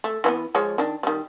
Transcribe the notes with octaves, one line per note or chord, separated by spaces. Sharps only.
A3
E3 G3 B3
F3 G#3 C#5
D#3 D4
D#3 G3